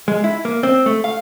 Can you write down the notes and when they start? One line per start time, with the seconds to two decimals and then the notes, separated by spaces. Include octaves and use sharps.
0.08 G#3
0.24 E4
0.45 A#3
0.63 C4
0.86 A3
1.04 F5